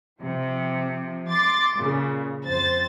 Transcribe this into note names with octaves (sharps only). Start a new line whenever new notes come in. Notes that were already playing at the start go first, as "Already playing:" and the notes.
C3 F3
C6 D6 A6
A#2 C#3
F2 C5 A6